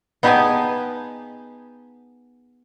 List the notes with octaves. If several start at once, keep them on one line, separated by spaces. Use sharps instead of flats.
B3 D#4 G4 G#4 G#5 A5